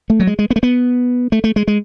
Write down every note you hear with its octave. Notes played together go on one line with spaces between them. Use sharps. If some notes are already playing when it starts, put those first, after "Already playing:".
A3
F#3
G#3
G#3
B3
A3
B3
A3
A3
G#3
G#3